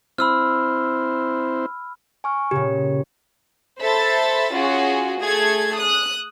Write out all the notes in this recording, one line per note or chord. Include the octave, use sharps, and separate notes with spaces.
C4 E4 C5 B5 E6 F6
G#5 C#6 F6
A#2 C#3 G4
A4 C5 E5 B5 A6
C#4 F4 F#4 G#4
A3 G#4 A4 G#6
D#6 F#6